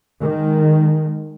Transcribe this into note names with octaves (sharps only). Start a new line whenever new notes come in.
D#3 G#3